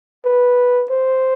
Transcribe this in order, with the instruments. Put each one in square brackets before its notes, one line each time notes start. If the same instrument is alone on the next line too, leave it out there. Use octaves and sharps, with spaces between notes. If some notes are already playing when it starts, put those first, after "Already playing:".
[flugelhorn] B4
C5